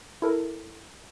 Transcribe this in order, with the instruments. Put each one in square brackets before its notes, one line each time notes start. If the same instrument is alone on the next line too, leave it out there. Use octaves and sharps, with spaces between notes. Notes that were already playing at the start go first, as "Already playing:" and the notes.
[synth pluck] E4 A4 A#4